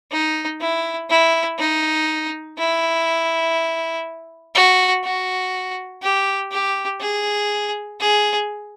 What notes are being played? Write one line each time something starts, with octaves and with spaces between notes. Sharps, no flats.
D#4
E4
E4
D#4
E4
F#4
F#4
G4
G4
G#4
G#4